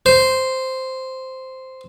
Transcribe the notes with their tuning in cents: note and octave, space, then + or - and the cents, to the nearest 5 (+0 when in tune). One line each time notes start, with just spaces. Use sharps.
C5 -5